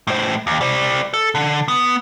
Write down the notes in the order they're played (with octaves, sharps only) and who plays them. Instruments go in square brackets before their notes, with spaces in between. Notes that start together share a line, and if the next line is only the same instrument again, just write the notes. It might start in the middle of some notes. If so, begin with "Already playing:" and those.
[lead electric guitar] A2 C5
D#2
G3 C5
A4
D3
B3